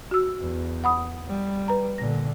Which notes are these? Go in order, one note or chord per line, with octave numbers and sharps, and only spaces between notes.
F#4 E6
E2
F#5 B5 D#6
G3
B4 A#5
A#2 D3 A#6